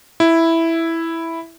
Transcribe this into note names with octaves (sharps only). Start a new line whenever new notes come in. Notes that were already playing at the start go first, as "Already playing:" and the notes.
E4